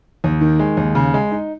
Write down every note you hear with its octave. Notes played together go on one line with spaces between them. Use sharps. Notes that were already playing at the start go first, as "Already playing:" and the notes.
D#2
D#3
G#3
D#2
C#3
G#3
D#4